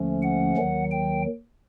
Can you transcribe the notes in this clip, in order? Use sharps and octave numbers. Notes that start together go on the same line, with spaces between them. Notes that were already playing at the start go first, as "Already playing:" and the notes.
Already playing: D#2 D3 F3 A3 C#4
F#5
D#2 D#3 F#3
G5